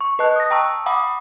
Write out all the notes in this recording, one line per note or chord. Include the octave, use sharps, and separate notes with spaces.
C#6
B4 D#5 A5 F#6
D#6 A#6
G5 A5 A#5 C#6 E6
F5 F#5 G#5 B5 D6 D#6